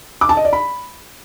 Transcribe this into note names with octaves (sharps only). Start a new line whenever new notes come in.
D6
A5
D#5
D5
B5